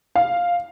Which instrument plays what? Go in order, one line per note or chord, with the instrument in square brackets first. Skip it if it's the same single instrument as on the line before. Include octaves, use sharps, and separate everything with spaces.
[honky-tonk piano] F5